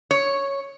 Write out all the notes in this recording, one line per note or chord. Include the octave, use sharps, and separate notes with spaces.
C#5